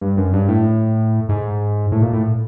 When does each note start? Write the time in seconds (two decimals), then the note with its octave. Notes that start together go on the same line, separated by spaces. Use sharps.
0.01 G2
0.17 F#2
0.33 G2
0.48 A2
1.29 G#2
1.92 A2
2.02 A#2
2.13 A2